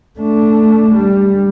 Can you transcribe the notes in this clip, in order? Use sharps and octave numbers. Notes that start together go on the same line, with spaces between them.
A3 D4
G3